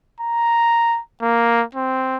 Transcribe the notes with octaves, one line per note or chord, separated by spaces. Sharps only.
A#5
A#3
C4